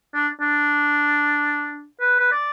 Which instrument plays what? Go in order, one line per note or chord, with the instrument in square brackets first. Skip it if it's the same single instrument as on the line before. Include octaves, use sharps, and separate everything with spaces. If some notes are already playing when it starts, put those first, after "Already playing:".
[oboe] D4
D4
B4
B4
D5